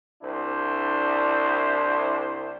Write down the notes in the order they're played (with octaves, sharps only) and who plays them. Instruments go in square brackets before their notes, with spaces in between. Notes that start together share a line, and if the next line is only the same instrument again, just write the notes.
[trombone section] C2 D4 E4 C5